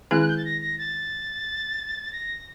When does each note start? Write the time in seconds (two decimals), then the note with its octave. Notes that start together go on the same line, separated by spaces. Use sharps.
0.11 D#3 G#3 C4 E4 G#4 F#6
0.21 F#6
0.28 G6
0.37 A6
0.45 A#6
0.61 A#6
0.78 A6
2.13 A#6